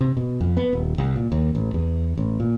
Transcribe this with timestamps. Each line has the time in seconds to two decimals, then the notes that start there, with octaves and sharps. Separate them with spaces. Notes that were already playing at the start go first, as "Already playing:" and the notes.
0.01 C3
0.17 B2
0.41 F2
0.57 B3
0.73 D#1
0.98 C2
1.16 A#2
1.32 D#2
1.55 A1
1.74 E2
2.18 A1
2.40 A#2